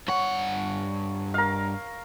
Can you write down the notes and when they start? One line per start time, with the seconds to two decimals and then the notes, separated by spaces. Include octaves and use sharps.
0.08 G2 C#5 F#5
1.34 A#4 F5